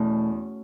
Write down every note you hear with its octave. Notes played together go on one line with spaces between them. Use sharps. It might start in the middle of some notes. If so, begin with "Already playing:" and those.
Already playing: E2 B2 E3 A3 C#4 E4